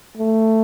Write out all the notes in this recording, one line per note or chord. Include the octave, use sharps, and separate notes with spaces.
A3